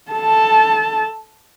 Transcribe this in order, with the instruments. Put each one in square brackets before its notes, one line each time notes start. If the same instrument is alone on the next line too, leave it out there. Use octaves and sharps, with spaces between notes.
[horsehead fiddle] A4 A5